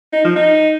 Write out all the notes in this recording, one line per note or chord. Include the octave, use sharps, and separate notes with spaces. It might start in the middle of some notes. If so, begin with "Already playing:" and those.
D#4
F3
D#4